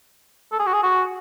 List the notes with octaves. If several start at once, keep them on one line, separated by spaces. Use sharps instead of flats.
A4
G#4
F#4
G#4
F#4